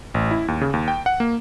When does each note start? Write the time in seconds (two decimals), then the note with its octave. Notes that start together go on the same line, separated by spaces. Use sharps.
0.14 A1
0.31 E4
0.48 D#2
0.61 C#3
0.73 D#2
0.88 G5
1.06 F#5
1.20 A#3